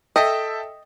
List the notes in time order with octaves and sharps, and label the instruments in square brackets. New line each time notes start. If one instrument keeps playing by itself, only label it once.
[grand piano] A4 E5 G5 [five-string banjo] D#5